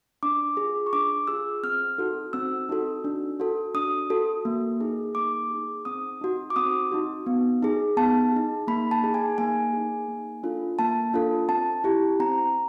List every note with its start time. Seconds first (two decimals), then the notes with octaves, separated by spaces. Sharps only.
0.23 D4 D6
0.57 F4 G#4
0.86 C#6
0.93 D4 D6
1.27 F4 G#4 E6
1.63 C4 F6
1.98 D#4 F#4 A4
2.33 C4 E6
2.69 D#4 F#4 A4
3.04 D4
3.40 F#4 A4
3.74 D4 D#6
4.10 F#4 A4
4.45 A#3
4.80 D#4 G#4
5.15 A#3 D6
5.51 D#4 G#4
5.85 C4 D#6
6.21 D#4 F#4
6.50 D6
6.56 C4 D#6
6.92 D#4 F#4
7.26 B3
7.62 D#4 G#4
7.97 B3 A5
8.32 D#4 G#4
8.67 A#3 B5
8.91 A5
9.03 D#4 G#4
9.14 G#5
9.38 A#3 G#5
9.73 D#4 G#4
10.08 A#3
10.43 D4 F4 A4
10.79 A#3 A5
11.13 D4 F4 A4
11.49 C4 A5
11.84 E4 G4
12.20 C4 A#5